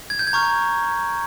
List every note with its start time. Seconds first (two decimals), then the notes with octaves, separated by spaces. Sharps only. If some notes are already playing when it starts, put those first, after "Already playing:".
0.10 G#6
0.19 G6
0.27 G#6
0.33 A#5 C#6 F6